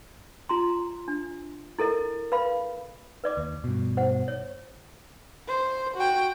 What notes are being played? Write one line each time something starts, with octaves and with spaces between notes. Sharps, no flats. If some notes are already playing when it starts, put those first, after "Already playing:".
F4 A#5 C6
D4
E4 A4 A#4 D#5
B4 F5 B5
B4 D5 D6
D#2
G2 B2
C5 F#5
C#5
C5
F#4 G5